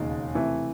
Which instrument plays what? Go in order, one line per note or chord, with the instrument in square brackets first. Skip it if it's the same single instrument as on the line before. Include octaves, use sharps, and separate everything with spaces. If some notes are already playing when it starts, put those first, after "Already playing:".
Already playing: [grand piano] E1 D#2 C#3 G#3 D#4
C3 E3 A3